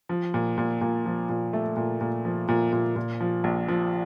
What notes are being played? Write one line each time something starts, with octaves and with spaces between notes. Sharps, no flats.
F3
A#2
A#2
A#2
F3
A#2
A3
A#2
A#2
F3
A#2
A#2
A#2
F3
A#1
F3